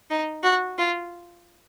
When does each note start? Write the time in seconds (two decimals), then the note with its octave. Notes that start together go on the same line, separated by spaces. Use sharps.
0.10 D#4
0.43 F#4
0.78 F4